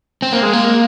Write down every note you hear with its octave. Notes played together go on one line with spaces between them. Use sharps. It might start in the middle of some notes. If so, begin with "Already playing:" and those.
C4
A#3
G#3
A#3